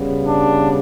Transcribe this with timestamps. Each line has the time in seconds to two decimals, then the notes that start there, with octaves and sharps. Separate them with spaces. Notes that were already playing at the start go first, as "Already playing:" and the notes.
Already playing: C#3 G3 B3
0.26 D4